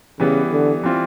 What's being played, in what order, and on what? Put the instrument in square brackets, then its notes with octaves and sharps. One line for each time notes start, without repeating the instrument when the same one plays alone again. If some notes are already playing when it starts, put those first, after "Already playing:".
[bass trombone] C#3 [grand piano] E3 G3 B3
[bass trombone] D3
[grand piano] E3 G3 C4 F4